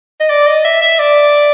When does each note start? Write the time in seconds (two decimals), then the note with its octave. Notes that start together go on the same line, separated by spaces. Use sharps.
0.20 D#5
0.30 D5
0.47 D#5
0.65 E5
0.82 E5
0.99 D5